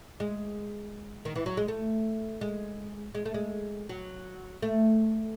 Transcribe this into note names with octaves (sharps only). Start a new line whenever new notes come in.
G#3
D#3
E3
F#3
G#3
A3
G#3
G#3
A3
G#3
F#3
A3